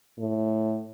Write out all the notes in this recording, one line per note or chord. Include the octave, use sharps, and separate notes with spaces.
A2